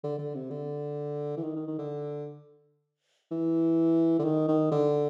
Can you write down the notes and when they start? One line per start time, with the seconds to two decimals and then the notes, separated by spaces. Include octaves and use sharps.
0.04 D3
0.19 D3
0.35 C3
0.51 D3
1.37 E3
1.43 D#3
1.56 D#3
1.67 D#3
1.79 D3
3.31 E3
4.19 D3
4.25 D#3
4.48 D#3
4.72 D3